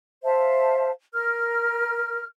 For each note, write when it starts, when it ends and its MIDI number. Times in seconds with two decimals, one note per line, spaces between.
0.24 0.90 72
0.24 0.90 76
0.24 0.90 77
0.24 0.90 81
1.13 2.25 70
1.13 2.25 89